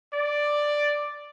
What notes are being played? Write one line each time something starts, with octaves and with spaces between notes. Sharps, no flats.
D5